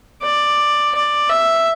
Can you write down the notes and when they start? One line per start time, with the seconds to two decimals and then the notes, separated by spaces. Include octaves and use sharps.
0.22 D5
0.94 D5
1.29 E5